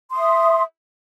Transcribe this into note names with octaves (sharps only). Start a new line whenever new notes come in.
E5 C6 D#6